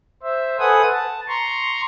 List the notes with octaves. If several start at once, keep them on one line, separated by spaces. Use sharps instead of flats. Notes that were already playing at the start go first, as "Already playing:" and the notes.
C5 E5
A4 B4 C5 F#5 G#5 D#6
A5
A#5 C6 C#6